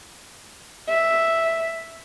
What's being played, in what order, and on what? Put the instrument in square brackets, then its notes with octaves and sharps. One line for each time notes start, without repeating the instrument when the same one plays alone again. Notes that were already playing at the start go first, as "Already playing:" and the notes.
[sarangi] E5